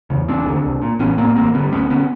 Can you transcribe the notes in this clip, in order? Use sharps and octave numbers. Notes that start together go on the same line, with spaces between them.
E2 C#3
E1 C4 D4
D#2 D3
C2
A#2
A1 B3 C#4
A2 A#3 C4
A1 A#3 C4
G2 D3 B3 C#4
D2 B3 C#4
D3 B3 C#4